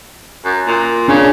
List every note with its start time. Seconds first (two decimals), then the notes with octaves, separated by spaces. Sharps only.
0.44 F#2
0.67 A#2
1.08 C#3 C#4 D4